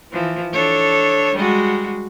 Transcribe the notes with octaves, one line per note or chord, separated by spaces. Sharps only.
E3 F3
D4 A4 C#5
G3 G#3 F#4